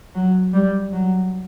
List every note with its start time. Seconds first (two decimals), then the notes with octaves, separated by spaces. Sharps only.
0.15 F#3
0.54 G3
0.92 F#3